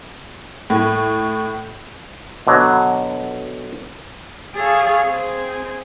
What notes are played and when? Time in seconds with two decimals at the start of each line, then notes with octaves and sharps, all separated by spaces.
0.70 A2
2.47 B2 D3 F#3
4.55 G#4 A4 C#5 F5 G#5
5.04 C4 G#4